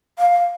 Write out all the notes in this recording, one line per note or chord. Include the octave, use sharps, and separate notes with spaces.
F5